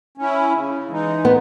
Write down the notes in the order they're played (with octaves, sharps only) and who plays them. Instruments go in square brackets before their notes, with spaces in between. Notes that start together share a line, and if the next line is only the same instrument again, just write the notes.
[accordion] C#4 E4
C#3
E3 G#3 D#4
[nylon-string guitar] B3